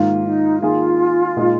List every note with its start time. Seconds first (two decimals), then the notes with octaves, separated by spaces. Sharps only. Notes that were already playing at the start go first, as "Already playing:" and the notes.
Already playing: G#2 D#3 A#3 F4
0.24 D#4
0.61 D#3 A#3 F4 G#4
1.37 A#2 G#3 D#4